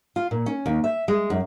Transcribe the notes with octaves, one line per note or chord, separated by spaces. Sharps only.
F4
A#2
C#4
D#2
E5
G#3
F#2